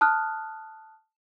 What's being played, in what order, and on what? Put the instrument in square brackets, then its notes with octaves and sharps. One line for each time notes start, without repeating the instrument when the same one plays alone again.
[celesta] A5 D#6 F6 F#6